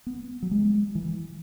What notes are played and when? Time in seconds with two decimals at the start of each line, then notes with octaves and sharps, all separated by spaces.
0.06 B3
0.42 F#3
0.51 G#3
0.95 E3